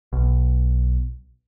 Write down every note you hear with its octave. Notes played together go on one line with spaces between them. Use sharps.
B1